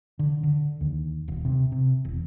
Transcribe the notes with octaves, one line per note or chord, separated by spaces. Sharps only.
D3
D3
D#2
D#1
C3
C3
E1